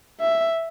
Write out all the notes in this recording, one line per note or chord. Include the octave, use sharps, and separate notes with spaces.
E5